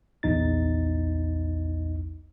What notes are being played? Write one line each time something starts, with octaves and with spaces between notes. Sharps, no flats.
A#1 E2 D#4 A6